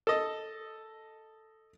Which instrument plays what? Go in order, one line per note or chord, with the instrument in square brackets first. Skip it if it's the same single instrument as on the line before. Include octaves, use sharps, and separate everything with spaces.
[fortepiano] A4 D#5